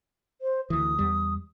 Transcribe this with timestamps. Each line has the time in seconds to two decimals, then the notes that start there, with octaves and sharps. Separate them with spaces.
0.41 C5
0.70 D2 E3 D#6
0.99 E2 G3